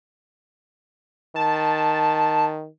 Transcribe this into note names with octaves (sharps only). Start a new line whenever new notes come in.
D#3 A5